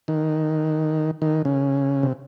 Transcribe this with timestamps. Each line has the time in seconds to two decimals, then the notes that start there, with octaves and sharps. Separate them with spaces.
0.08 D#3
1.22 D#3
1.45 C#3
2.03 C3